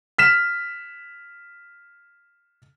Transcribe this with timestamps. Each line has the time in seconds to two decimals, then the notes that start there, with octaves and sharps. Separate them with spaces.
0.18 F6 B6 E7